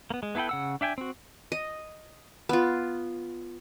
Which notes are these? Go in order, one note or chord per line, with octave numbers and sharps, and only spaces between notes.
A#3 B3
G#3
B3 E4 A4 B4 G5
C#3 F#5 E6
D4 E5 G5 G#5
C4 F#4
D#5
B3 F4